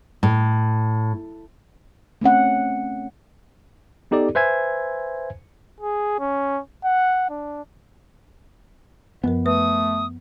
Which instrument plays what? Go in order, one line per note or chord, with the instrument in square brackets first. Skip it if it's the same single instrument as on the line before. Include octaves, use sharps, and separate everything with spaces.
[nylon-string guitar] A2
[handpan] A3 C4 C#4 F#5
[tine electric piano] B3 D#4 G4 A4 D5
B4 C5 E5 G#5 G#6
[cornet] G#4
C#4
F#5
D4
[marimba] F#2 F3 A#4 [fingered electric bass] B3
[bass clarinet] A3 [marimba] B4 [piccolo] D#6